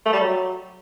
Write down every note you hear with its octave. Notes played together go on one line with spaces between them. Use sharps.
A3
G3
F#3